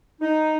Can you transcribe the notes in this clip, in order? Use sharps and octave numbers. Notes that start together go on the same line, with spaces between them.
D#4